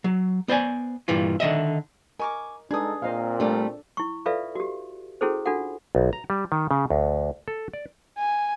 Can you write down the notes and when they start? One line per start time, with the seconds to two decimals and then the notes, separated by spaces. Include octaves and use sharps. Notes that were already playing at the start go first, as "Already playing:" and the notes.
0.04 F#3
0.48 B3 C5 D5 G#5
1.08 G2 A#2 E3 F4
1.40 D3 D#3 D#5 E5
2.19 A#4 D#5 G#5 C#6 D6
2.71 G#3 D4 D#4 G#4 A4 B4 D#6
3.02 A#2 A#3 C4 C5 D#5 F5
3.40 G3 A3 D4 A4 D5
3.97 E4 C#6
4.26 F4 A4 B4 D5 E5 F5
4.55 F#4 G4
5.21 C#4 E4 F#4 G#4 A4 C5
5.46 D4 F4 F#4 A4 F#5
5.95 B1
6.13 A#5
6.30 G3
6.52 D#3
6.71 C#3
6.90 D2
7.48 A4
7.73 D5
8.18 G#5